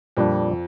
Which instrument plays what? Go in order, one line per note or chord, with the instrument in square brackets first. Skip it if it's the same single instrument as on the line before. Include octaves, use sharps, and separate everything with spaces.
[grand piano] F2 [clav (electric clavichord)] A#2 G3 D4